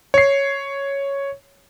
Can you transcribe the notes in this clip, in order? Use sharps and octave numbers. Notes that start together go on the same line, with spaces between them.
C#5 C7